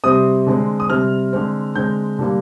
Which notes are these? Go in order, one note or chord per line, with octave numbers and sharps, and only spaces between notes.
C3 G3 C4 D#6
D3 G#3 C4
D#6
C3 G3 C4 F6
D3 G#3 C4
D3 G#3 C4 G6
D3 G3 A#3